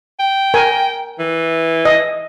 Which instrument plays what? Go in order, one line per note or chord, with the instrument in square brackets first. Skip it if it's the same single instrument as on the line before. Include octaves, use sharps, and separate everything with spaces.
[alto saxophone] G5
[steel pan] A#4 G#5
[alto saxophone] E3
[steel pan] D#5